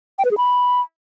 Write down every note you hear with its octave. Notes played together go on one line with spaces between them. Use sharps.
G5
B4
G#4
B5